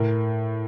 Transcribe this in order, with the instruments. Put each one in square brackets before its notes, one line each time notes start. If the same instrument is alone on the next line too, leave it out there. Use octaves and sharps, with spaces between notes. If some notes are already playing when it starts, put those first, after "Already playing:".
Already playing: [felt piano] A2 A#4